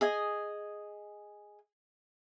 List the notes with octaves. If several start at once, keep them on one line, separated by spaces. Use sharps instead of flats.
G#4 D#5 G#5